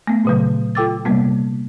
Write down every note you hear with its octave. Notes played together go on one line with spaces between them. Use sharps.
A3 B3
A#2 C#3 F#3
F4 A4 G5 D6 E6 A6
C3 G3 A#3 B3